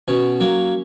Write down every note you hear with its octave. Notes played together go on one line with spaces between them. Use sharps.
B2 C#4
F#3 A#3